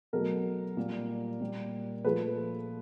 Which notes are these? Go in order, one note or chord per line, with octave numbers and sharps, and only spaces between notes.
B2 F#3 A3 A#4
A#2 G3
A#2 G3
A#2 F3 A3 B4